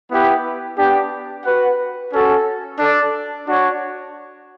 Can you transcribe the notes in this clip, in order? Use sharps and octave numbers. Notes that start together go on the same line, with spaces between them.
B3 E4 G4 B4
B3 D4 G4
F#4 B4 F#5
C#4 F#4 A4
D4 A4 D5
D4 F#4 C#5